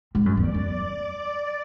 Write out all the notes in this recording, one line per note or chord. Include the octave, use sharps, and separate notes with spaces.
G#2
F#2
E2 D5
F#2